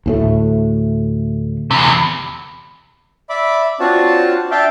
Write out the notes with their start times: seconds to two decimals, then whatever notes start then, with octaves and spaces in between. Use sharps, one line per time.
0.06 D2 A2 A3
1.71 E2 C3
3.29 D5 E5 B5 D6
3.80 C4 D4 F4 F#4 C#5 A5
4.51 D4 E5 F5 G5 A5